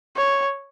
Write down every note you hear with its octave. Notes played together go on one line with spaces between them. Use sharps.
C#5